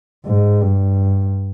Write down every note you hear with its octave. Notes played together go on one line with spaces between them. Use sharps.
G#2
G2